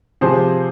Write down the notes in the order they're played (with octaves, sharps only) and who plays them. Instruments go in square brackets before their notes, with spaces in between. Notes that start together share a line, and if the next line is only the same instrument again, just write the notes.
[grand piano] C3 F3 G#4 C5